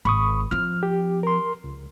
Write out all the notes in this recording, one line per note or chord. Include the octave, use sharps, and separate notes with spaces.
G#1 B5 C#6 D#6
F3 C4 F6
G4
A#4 C6
C#2